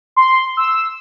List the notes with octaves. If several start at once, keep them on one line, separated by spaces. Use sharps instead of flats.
C6
E6